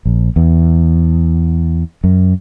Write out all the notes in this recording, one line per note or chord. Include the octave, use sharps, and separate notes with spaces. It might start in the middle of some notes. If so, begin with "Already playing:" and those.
A#1
E2
F#2